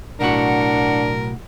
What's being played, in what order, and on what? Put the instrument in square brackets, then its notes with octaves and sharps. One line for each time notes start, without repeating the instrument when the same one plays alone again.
[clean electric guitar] B1 A2 F#4 [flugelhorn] D4 [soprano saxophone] A#4 [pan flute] F#5